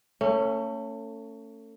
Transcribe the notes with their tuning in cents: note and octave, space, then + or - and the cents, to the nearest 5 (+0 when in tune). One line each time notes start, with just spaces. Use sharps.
A3 +35 C#4 +0